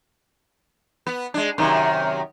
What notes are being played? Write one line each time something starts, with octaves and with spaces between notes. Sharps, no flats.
B3
G#3 D4
F#2 C3 D#3